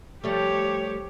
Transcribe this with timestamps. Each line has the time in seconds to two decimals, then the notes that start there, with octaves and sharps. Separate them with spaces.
0.24 F3 G3 A3 G4 C#5